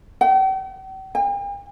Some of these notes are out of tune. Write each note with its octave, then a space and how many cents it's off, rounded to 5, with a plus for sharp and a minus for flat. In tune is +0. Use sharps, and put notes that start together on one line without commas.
G5 -45
G5 +45